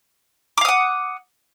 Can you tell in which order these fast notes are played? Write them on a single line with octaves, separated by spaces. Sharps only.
D6 F5 D#6 F#5